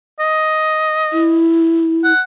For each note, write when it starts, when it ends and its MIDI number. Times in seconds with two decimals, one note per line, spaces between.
0.20 1.43 75
1.13 2.13 64
2.04 2.21 78